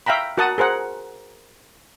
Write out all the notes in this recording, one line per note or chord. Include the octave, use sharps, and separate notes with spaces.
E5 F5 G5 A#5 B5
F#4 A#4 F#5 A5 D#6
G#4 A#4 C5 F#5